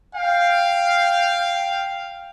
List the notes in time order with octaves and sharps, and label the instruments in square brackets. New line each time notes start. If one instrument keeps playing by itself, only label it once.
[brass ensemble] F5 G5